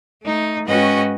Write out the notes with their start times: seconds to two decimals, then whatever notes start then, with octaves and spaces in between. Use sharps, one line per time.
0.22 A3 D#4
0.65 G#2 C#4 F#4 B4 D#5 G5